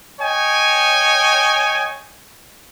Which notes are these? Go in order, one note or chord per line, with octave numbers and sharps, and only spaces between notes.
C#5 D#5 G5 G#5